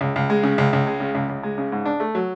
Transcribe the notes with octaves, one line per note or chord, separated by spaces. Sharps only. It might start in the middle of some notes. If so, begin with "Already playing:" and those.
C#2
C#2
G#3
C#3
C#2
C#2
G#3
C#3
C#2
C#2
G#3
C#3
G#2
D4
A3
F#3